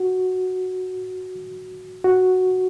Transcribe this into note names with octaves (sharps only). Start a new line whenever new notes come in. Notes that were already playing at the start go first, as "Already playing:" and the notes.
Already playing: F#4
F#4